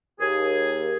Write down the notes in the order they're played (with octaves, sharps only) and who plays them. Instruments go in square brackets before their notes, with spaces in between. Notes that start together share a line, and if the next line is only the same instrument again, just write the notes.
[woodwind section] D#2 G#4